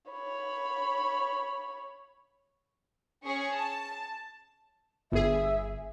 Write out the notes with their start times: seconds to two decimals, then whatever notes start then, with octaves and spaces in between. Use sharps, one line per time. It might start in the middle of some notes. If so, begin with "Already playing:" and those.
0.11 C#5 B5
3.25 C#4 G#4 C#6
3.56 A5
5.12 G1 G#4 E5